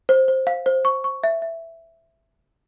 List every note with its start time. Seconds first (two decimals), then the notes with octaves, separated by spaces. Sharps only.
0.09 C5
0.28 C5
0.47 F5
0.66 C5
0.85 C#6
1.04 C#6
1.24 E5
1.42 E5